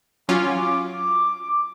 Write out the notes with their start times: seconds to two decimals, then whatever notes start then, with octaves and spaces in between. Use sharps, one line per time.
0.29 F#3 C#4 F4 D6